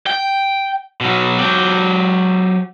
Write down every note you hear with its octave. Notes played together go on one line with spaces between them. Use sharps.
G5
B2 F#3
F#3 G4